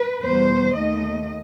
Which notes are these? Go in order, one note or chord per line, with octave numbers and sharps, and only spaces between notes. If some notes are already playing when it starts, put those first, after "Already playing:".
Already playing: B4
E2 B2 G3 C5
D#2 D#3 A3 D#5